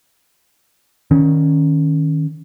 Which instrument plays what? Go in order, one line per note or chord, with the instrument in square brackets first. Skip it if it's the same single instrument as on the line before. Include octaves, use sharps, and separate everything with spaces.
[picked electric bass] D#3 C#4